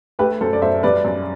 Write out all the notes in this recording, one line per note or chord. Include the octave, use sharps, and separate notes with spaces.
A3 G4 B4
F#2 A4 C5
D5
F#2 C5 E5
G3 B4 D5
F#2